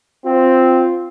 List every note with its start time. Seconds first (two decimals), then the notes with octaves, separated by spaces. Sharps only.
0.25 C4 F4